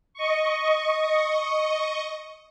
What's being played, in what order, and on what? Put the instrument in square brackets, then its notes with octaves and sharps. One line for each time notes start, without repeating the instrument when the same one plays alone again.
[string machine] D#5 C#6